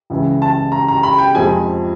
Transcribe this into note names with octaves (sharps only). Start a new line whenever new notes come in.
C#2 C#3 E3
A5
A#5
A#5
B5
G5
F2 C3 F3 G#3 G#5